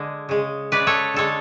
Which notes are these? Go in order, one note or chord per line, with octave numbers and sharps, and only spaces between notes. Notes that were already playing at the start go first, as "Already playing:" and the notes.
Already playing: D3 G#3
C#3 G#3
C#3 G#3 B4 D5
A4 C#5
D3 G#3 A4 C#5